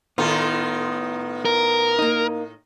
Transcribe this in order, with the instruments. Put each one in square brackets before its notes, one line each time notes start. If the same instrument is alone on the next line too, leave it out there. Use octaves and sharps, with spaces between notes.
[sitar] A2 D#3 F4 [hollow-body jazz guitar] B3 A4
[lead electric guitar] A#4
[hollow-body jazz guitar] A#3 D#4